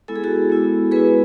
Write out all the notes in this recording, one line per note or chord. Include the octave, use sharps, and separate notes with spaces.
G#3 B3 E4 A4
G#4
F#4 A4
G#3 B3 E4
G#3 B3 E4 G#4 B4